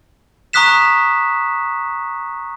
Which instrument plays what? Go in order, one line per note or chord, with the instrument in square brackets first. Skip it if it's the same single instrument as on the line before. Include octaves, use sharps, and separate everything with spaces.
[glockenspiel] A#5 C#6 D#6 F#6 B6 E7